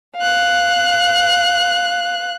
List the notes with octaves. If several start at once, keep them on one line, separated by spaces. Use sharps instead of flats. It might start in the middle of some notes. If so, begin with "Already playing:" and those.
F5 F#6